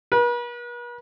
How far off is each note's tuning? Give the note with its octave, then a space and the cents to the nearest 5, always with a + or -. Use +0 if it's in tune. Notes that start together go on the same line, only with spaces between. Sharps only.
B4 -45